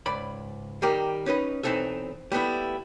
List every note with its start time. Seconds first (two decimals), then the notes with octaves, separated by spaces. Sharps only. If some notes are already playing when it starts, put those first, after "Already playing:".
0.06 C#2 G#2 D5 B5
0.82 D#3 G3 G4 A#4
1.26 C#4 D#4 B4 D#5
1.63 B1 E3 C4 D#4 A4 E5
2.32 G3 A3 B3 E4